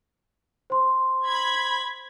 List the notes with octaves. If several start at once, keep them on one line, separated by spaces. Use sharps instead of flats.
C5 C6
B5 G#6